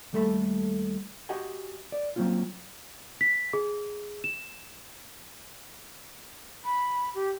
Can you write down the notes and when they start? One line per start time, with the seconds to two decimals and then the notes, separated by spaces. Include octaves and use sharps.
0.13 D#2 G3 A3 A4 A#4 B5
1.29 F#4 G4 D#5 F#5 G#5
1.92 D5
2.16 F#3 A#3 C4 C#4 F4
3.21 B6
3.53 G#4
4.24 E7
6.65 B5
7.15 G4